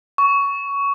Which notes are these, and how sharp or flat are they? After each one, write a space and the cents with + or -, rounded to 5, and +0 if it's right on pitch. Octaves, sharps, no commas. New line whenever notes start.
C#6 +15